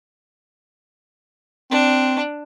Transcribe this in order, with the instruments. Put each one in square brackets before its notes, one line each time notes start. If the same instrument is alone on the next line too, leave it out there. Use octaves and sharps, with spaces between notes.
[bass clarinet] C4 [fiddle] D4